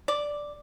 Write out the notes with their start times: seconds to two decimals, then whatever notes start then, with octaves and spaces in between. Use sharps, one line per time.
0.08 D5